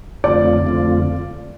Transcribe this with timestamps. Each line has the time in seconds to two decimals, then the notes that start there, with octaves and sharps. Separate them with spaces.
0.24 F2 D3 A3 C4 F4 D5
0.66 F2 D3 A3 C4 F4